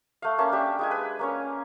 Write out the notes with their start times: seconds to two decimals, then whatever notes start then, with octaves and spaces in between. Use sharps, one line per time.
0.22 A3 F5
0.38 A#3 C#4 F5 A5
0.52 D4 G4 E5
0.79 G#3 F4 G#5
0.91 B4
1.19 A#3 C#4 C#5